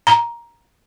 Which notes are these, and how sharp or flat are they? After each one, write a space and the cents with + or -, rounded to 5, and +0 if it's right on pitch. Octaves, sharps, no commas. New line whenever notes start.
A#5 +10